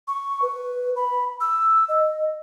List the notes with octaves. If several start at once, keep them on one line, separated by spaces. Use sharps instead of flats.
C#6
B4
B5
E6
D#5